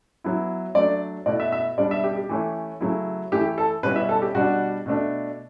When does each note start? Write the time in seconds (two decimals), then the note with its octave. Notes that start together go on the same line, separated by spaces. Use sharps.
0.24 F#3 B3 E4
0.75 F#3 A3 D4 D5
1.26 B2 A3 E4 D5
1.40 E5
1.52 E5
1.78 B2 G3 B3 D4 D5
1.91 E5
2.04 G4
2.17 G4
2.29 E3 A3 C#4
2.81 C#3 F#3 A3 E4
3.32 E3 A3 E4 G4
3.58 A4
3.83 B2 G3 C#4 E4 B4
3.96 E5
4.09 A4
4.22 G4
4.35 B2 G3 D4 F#4
4.86 B2 A3 D4